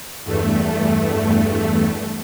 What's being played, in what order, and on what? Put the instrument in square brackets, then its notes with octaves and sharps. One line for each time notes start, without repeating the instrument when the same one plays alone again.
[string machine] E2 G2 A3